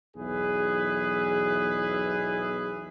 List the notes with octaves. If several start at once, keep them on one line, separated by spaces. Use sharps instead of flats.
B1 E2 G#4 B4 E5